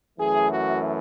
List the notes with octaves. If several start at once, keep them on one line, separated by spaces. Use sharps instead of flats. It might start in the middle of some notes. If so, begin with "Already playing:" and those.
F#2 E3 A3 G#4
F#4